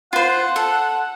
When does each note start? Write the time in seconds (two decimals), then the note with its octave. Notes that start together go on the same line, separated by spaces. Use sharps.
0.13 F4 C5 F#5
0.56 A4